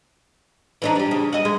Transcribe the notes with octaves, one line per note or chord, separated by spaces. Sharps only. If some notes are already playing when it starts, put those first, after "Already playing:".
E3 D4 D#4
G3 G4
C#3
F#4 D#5
G#3